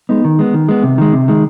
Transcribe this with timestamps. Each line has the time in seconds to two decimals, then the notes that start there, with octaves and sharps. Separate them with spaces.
0.09 G#3 B3 D#4
0.25 D#3
0.39 G#3 B3
0.54 D#3
0.69 G#3 B3
0.83 C3
0.98 D#3 G#3
1.13 C3
1.28 D#3 G#3